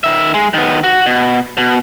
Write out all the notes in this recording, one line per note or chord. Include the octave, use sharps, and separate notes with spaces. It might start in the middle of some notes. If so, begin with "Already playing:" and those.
D#3 E5
G#3
D#3 B3
F#4
B2
B2